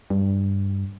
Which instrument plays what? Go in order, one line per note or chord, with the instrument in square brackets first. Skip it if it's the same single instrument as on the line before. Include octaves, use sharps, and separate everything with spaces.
[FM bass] G2